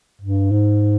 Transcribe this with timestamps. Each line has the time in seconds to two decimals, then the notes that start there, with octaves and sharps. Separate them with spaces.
0.21 G2
0.51 G#2